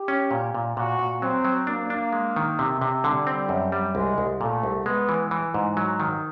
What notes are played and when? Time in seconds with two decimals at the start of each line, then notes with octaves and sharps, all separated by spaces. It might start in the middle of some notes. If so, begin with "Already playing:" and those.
Already playing: G4
0.08 C#4
0.31 A#2
0.55 A#2
0.76 A#2 F#4
0.99 A#2
1.22 F#3 C4
1.45 F#3
1.67 A#3 D4
1.90 D4
2.13 G#3
2.36 D#3
2.59 C3
2.81 C3
3.04 D3 G3
3.27 C4
3.49 F#2
3.72 G3
3.95 C2 G#3
4.18 C2
4.40 A#2 A3
4.63 C2
4.86 G#3 B3
5.09 E3
5.31 E3
5.54 G#2
5.77 F#3
6.00 D#3